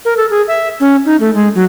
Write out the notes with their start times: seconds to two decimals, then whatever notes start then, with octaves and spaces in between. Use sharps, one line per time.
0.05 A#4
0.17 A4
0.30 G#4
0.48 E5
0.80 C#4
1.05 D#4
1.20 A3
1.34 G#3
1.55 F#3